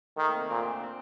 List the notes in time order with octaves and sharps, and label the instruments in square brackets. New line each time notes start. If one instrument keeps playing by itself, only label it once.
[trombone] D#3 [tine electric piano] A3
[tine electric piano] A#3
C4
A#3
[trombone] A#2 [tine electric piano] C4
[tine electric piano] D4
C4